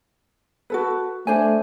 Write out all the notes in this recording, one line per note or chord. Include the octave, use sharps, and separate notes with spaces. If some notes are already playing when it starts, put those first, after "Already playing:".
F#4 A4 B4
A3 D4 C5 G#5